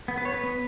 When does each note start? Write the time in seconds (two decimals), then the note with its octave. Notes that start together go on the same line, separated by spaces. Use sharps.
0.08 B3
0.18 B4
0.25 B3 C#5
0.34 B4
0.43 B3